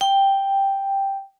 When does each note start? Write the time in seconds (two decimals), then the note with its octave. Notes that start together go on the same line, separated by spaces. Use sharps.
0.01 G5